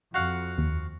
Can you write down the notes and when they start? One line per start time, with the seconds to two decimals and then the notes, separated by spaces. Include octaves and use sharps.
0.14 F2 F#4 F5 F#5
0.58 D#2